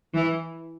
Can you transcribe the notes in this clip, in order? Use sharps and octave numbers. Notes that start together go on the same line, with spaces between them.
E3